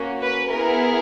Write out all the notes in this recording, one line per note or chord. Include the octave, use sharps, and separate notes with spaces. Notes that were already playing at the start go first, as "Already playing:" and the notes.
Already playing: A#3 C#4 F#4
B4
B3 E4 G#4 A#4